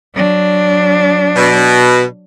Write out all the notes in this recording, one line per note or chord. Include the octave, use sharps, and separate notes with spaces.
F#3 D4
B2